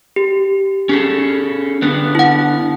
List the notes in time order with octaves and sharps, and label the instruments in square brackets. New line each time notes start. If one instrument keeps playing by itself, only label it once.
[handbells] G4
[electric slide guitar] C#4 G#4 A4
D3 B3 D4
[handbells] E4 F#5